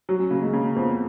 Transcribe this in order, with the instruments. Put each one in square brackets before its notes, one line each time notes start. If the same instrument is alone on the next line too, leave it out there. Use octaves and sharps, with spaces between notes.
[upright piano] F#3
[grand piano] C#4
[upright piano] C#3 [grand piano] A#3
[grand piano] G#3
[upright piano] C#3 [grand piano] A#3
[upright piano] F2 [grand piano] B3